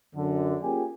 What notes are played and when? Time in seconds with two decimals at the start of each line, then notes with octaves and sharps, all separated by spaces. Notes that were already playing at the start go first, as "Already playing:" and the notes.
0.15 F#2 D3
0.62 A#3 C#4 F4 G4 G#4 G#5